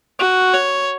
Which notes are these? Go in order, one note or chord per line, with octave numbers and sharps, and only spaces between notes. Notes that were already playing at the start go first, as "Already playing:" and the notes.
F#4
C#5